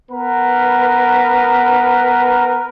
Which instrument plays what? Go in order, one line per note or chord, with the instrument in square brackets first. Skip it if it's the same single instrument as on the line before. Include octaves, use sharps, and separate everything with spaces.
[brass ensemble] B3 A#4 B4